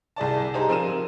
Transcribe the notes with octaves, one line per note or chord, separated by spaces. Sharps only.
C2 G#4 D5 A5
D#4 G4 G#4 C5 A#5
F3 C4 A#4 D#7 E7